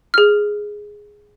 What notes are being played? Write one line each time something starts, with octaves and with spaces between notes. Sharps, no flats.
G#4 F6